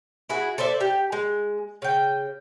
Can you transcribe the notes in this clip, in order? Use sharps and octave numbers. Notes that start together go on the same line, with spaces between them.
E4 F#4 G#4
A4 C5 D5 E5
G4
G#3
C#3 G5